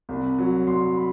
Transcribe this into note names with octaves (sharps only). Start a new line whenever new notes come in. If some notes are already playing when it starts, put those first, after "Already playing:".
C2
F#3
C2 C6
B5